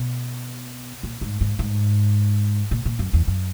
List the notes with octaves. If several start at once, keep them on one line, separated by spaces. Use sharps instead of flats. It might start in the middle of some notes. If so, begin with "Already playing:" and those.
Already playing: B2
A#2
G#2
G#2
G#2
A#2
A#2
F#2
E2
F#2